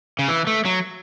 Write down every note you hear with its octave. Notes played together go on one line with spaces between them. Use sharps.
C#3
E3
A3
F#3